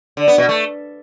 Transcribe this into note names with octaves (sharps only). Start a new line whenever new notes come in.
D3
B3
B2
A3